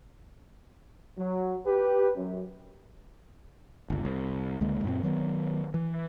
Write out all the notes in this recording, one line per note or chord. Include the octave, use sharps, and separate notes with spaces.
F#3
G4 B4
F#2
G1 C#2
C2
C#2 D3 G#3 A#3
F#2 A#2 B3 C4
D#3 F#3 A#3 B3
E3